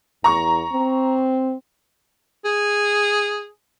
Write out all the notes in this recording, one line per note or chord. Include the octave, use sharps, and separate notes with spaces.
E2 A#5 C#6
C4
G#4